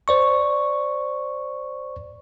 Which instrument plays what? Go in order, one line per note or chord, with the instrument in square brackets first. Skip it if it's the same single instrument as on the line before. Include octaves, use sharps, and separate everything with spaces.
[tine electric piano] C5 D5 C#6